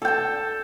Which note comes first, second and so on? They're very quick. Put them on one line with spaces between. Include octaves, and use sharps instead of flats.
A4 G5 A5